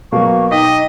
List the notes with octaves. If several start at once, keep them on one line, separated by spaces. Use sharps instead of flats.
B2 F#3 A#3 C#6
D#4 G4 D#5 B6